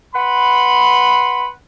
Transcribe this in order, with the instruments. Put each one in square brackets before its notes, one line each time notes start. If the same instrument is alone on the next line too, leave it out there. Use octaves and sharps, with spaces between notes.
[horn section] B4 F#5 B5 C6